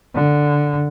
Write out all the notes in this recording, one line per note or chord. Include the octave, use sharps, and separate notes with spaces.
D3